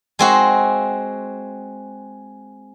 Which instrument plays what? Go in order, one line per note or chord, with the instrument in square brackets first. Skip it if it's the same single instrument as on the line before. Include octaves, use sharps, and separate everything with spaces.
[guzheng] G#3 C4 F#4